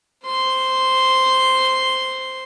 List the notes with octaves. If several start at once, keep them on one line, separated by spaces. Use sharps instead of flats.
C5 C6